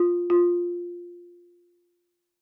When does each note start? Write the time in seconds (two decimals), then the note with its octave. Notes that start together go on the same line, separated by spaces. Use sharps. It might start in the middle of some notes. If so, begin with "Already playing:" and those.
Already playing: F4
0.30 F4